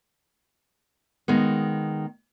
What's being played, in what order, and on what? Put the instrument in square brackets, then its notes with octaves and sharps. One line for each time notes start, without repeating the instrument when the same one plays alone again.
[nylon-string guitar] D#3 G#3 B3